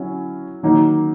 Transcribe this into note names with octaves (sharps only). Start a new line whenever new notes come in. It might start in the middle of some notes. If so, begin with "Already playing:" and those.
Already playing: F#3 C#4 E4
D#3 F#3 A#3 D#4